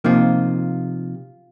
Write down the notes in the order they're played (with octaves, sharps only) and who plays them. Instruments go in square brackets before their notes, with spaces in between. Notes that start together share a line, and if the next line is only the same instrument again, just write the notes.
[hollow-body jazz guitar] C3 F3 A#3 D#4 F4